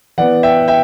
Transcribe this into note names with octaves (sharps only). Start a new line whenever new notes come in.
E3 B3 D5 F#5
E5 G5
E5 G5